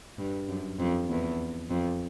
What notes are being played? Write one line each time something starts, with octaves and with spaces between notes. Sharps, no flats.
G2
F#2
F2
E2
F2